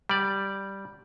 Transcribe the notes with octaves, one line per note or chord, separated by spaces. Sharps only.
G3 D5